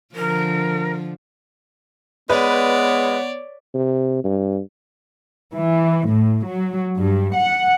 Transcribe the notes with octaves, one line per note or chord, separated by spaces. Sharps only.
D3 F3 A#4
G#3 B3 B4 C#5 D5
C3
G2
E3
A2
F#3
G2
F#5